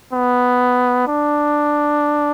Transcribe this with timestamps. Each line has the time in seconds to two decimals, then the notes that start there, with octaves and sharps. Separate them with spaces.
0.13 B3
1.07 D4